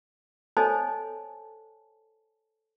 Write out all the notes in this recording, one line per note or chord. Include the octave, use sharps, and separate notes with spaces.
A4 C5 C#5 D#5 G#5 A5